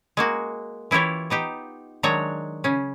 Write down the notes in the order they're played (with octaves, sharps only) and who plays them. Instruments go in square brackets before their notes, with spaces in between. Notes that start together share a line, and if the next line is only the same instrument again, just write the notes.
[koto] G#3 A#3 F#4
E3 E4 F4 G4 C#5
B3 D#4 G4
D#3 F#3 G#3 D4 C#5 A#5
C#3 C#4